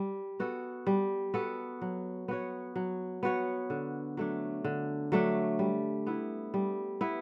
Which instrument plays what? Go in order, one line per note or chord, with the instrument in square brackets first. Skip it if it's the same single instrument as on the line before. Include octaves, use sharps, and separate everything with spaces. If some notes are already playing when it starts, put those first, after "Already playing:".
Already playing: [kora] G3
B3 F#4 A4
G3
B3 F#4 A4
F#3
B3 F#4 C#5
F#3
B3 F#4 C#5
D3
F#3 A3 D4
D3
F#3 A3 D4
G3
B3 E4
G3
B3 E4